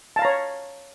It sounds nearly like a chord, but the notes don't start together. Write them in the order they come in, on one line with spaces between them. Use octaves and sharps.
A5 F5 A#5 C#5